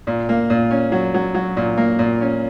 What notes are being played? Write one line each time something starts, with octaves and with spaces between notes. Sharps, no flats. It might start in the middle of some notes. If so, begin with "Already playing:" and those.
A#2
A#3
A#2
C#4
F#3
F#3
F#3
A#2
A#3
A#2
C#4